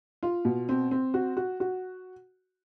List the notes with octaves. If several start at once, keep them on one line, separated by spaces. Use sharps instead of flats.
F4
B2
C4
C4
F#4
F#4
F#4